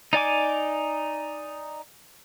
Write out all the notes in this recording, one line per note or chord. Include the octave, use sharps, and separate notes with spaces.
D#4 D5 G#5 D6